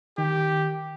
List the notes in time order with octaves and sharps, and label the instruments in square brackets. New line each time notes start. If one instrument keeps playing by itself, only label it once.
[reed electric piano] D#3 [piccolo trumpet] G4